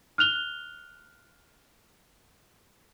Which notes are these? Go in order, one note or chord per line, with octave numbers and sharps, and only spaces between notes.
F6 F#6 F7 G7